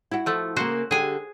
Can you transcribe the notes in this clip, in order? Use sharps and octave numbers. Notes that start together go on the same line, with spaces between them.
E4 F#4
F3 A3
C#3 A#3 F#4 C5
D3 G4 G#4 G#5